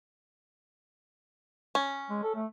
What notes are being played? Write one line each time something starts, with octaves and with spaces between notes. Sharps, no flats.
C#4
G#3
A4
A3